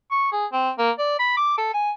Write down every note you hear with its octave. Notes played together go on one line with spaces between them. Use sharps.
C#6
G#4
C4
A#3
D5
B5
D6
A4
G#5